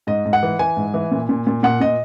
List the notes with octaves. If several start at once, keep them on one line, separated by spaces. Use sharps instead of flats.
G#2 D#5
G#2
F#5
E3
E3 G#5
G#2
E3
A#2
A#2
A#2
A#2 F#5
A#2 D#5